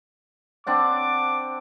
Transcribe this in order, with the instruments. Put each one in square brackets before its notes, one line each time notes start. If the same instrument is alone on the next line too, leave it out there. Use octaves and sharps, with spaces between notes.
[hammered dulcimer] C4 D4 F#5 [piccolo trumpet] D6